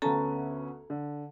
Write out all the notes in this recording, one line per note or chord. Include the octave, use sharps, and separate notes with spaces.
D2 B3 C#4 A4 A5 A#5
D3